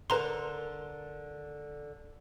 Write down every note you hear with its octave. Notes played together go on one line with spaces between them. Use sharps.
D3 A#4 B4 A#5 C6